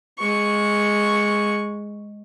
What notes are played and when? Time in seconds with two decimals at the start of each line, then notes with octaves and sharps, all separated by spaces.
0.19 G#3 C#6